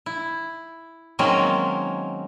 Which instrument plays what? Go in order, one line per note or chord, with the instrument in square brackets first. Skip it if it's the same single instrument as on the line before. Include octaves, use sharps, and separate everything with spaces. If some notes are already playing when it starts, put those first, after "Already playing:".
[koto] E4
D#3 F#3 G#3 A#3 C4 C#4